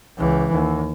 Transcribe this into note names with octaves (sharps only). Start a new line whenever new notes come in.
C#2 E3
D#2